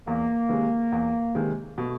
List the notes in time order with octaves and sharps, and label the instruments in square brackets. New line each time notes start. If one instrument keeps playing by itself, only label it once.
[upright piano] E2 [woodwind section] A#3
[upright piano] C3 D#3 G#3
E2
C3 D#3 G#3
[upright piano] B2 [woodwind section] A3